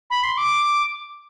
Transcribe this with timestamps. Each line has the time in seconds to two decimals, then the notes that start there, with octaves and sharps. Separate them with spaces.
0.10 B5
0.24 C6
0.37 D6